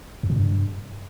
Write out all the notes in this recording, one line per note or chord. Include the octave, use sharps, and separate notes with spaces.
F2
B2
G2